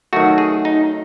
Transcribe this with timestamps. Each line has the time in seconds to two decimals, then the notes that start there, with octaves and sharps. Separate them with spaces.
0.13 D#3 F#3 A3 F#4
0.38 G#4
0.65 D#4